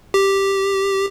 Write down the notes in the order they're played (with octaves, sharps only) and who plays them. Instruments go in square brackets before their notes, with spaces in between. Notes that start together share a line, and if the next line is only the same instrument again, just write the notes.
[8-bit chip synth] G4